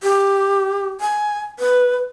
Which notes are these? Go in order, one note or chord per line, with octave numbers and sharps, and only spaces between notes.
G4
G#5
B4